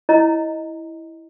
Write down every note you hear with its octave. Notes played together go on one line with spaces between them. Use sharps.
E4 C#5 D#5 A#5